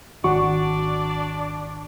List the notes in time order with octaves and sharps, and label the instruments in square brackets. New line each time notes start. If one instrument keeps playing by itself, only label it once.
[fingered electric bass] G#1 D#3 [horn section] D4 D5 [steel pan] F#4 [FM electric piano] C#6